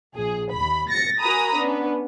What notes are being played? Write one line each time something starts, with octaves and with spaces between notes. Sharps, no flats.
A#1 G#4
D#2 B5
A6 A#6 C#7
F#4 A#4 G#5 A#5 B5 D#6
B3 C#4 D4